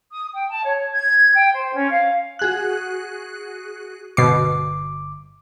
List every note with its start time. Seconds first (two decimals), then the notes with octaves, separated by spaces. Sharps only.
0.11 D#6
0.33 G5
0.49 A5
0.64 C#5
0.94 G#6
1.34 G5
1.53 C5
1.73 C#4
1.90 F5
2.39 F#4 G#4 F#6
4.17 G1 B2 D6 C7